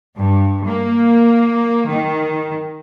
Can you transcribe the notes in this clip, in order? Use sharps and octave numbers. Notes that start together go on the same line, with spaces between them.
G2
A#3
D#3